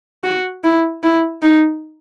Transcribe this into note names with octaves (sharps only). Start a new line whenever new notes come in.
F#4
E4
E4
D#4